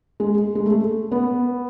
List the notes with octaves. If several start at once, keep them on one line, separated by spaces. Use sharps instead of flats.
G#3
G#3
A3
B3